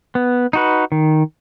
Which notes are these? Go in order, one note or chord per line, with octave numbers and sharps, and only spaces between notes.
B3
D#4 F#4 B4
D#3